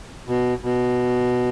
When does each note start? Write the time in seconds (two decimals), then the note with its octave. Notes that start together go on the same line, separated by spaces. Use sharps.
0.28 B2
0.64 B2